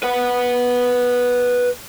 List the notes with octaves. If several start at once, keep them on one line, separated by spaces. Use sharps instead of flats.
B4 F#5